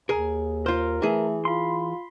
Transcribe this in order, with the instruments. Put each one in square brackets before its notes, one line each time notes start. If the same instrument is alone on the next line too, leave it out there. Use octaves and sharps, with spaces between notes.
[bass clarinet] D#2 [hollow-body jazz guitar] G#4 A#4
[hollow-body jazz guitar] F4 C5 [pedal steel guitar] A#4
[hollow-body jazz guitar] E3 G#4 [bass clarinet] A3
[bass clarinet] F4 [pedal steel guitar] B5 C6